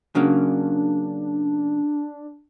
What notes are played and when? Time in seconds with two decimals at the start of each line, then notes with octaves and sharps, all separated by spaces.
0.15 C#3 F#3 A#3 D4